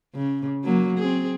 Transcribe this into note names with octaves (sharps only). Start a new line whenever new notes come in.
C#3
F#3 A#3
C4 G#4